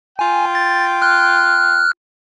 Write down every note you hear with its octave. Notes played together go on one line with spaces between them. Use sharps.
F4 G5 G#5
A6
F6 F#6